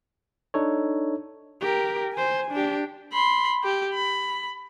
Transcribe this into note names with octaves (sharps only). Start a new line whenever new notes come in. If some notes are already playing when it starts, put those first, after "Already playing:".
D4 D#4 A4 C#5
G4 A#4
C5 G#5
D4 G4
B5 C6
G4
B5